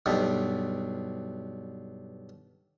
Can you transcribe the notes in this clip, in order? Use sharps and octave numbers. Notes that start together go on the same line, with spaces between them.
B1 G2 B2